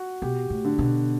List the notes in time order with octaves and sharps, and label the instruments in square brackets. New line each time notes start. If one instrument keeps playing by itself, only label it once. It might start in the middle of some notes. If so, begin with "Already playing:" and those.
Already playing: [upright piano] F#4
[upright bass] B2 [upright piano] G4
[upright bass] A2
[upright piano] D3
[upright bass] B2